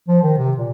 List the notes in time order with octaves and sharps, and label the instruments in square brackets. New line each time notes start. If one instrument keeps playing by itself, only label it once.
[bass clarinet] F3
D#3
C3
A#2